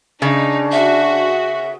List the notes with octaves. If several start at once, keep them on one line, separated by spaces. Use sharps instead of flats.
C#3 D4 D#4
F#4 E5